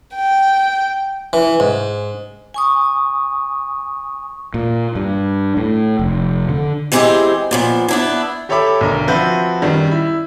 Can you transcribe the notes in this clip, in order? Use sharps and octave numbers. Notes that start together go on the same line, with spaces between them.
G5
E3
G#2
G#5 C#6 D#6
A#2
G2
A2
F1
D3
E3 G#3 C4 D#4 G4 G#4
A#2 F3 B3
B3 D4 E4
G4 A4 C#5 E5 B5 D6
B1 D3 A#4
F3 C4 F#4 B4 E5 G6
F#2 D#3 G3
E4